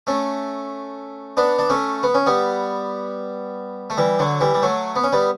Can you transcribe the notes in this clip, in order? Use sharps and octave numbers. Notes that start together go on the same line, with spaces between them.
A3 C#4
B3 D4
D4
A3 C#4
B3
C#4
G3 B3
A3
E3 G3
D3 F#3
E3 G3
G3
F#3 A3
B3
C#4
G3 B3